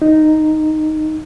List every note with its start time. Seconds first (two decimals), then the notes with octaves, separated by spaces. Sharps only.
0.02 D#4